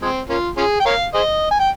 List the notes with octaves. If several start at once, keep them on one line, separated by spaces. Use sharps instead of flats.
F3 G#3 C4
A#3 C#4 F4
C#4 F4 G#4
G5
A#4 C#5 F5
G#4 C5 D#5
G#5
G5